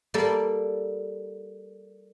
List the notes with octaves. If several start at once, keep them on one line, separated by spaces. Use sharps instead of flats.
G3 A#3 A4 D5